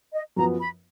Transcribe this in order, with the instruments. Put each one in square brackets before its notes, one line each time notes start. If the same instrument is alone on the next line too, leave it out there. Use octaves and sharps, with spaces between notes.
[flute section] D#5
[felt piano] F#2 F3 B3 [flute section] A#5
[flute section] B5